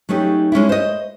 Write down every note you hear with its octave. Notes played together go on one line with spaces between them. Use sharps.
F#3 A3 C#4 D#4 G4
G#3 C#4 D4 E4
C5 D#5